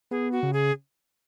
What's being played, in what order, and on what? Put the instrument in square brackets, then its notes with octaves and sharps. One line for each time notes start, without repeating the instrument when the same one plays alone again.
[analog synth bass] B3 [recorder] G#4
[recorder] F#4
[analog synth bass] C#3
[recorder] G#4